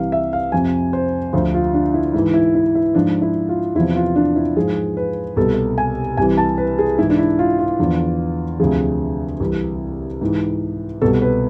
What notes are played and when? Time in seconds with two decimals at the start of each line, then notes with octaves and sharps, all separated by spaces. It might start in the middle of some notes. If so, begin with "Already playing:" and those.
Already playing: C2 C3 E3 F5
0.12 E5
0.33 F5
0.52 F2 C3 F3 G#5
0.93 C5
1.33 D2 D3 F3 C5
1.54 F4
1.74 D4
1.94 E4
2.14 G#2 E4
2.18 E3
2.34 E4
2.55 E4
2.75 E4
2.95 G#2 F3 D4
3.22 E4
3.49 F4
3.75 E2 C3 F3 E4
3.96 F4
4.16 D4
4.36 E4
4.56 G#2 F3 G#4
4.97 B4
5.36 C2 B2 A4
5.78 G#5
6.17 C2 C3 E3 G#5
6.38 A5
6.58 B4
6.78 G#4
6.98 G#2 E3 E4
7.10 D4
7.19 E4
7.39 F4
7.59 F4
7.79 E2 D3 F3
8.59 D2 C3 F3 G#4
9.40 C2 C3 E3
10.21 G#2 E3
11.02 C2 B2 A4
11.22 B4